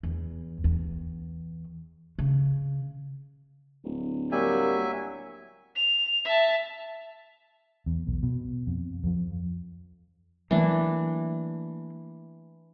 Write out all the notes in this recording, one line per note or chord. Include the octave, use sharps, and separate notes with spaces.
E2
E2
C#3
D1
F#3 G3 A#3 E5 G#5
F7
E5 A5
E2
B1
B2
F2
F2 F3
E3 F#3 A3 A#3 D4